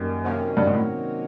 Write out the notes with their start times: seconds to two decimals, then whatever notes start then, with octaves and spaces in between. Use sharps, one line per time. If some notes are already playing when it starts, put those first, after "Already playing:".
Already playing: F#2 D#3 G3 A#3
0.24 C3 D#3 F#3 A#3 C#4
0.57 G2
0.66 G#2
0.73 A2